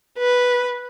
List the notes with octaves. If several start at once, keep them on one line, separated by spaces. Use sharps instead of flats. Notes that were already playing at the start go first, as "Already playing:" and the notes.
B4